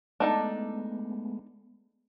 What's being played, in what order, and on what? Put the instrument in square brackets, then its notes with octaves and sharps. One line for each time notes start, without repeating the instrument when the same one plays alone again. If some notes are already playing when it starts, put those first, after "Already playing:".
[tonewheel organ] G#3 A3 B3 [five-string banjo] D4 D#4 A4